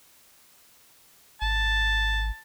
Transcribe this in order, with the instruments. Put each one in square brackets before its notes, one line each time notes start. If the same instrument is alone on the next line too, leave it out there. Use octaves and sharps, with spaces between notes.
[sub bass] G#1 [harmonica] A5